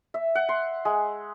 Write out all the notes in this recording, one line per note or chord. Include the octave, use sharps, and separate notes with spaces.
E5
F#5
C6
G#3